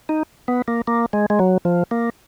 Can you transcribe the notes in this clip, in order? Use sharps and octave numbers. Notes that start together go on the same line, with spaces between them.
D#4
B3
A#3
A#3
G#3
G#3
F#3
F3
A#3